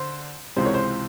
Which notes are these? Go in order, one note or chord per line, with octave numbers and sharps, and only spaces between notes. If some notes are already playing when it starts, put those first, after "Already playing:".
Already playing: D3 C5
C#2 C3 E3 G#3 C5
C#5
C5